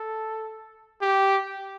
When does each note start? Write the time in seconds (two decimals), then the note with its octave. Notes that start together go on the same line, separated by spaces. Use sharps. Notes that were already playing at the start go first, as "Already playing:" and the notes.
Already playing: A4
1.02 G4